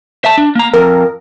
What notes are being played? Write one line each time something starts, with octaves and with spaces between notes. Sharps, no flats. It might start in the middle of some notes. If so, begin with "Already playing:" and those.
E5 A5
D4
A#3 A#5
F2 A#4